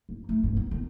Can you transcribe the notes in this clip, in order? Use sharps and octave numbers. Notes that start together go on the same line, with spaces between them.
G2
A3
G2
B3
D#3